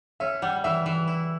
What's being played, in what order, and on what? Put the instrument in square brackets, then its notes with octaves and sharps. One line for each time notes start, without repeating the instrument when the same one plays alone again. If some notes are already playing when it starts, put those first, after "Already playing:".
[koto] C#4 [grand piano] E5
[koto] G3 [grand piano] F#5
[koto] E3 [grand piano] E5
[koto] E3
E4